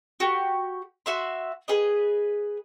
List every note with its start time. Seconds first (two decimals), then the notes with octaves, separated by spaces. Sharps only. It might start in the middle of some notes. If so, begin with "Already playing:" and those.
0.20 F#4 G4
1.06 F#4 E5 C6
1.68 G#4 B4 D#5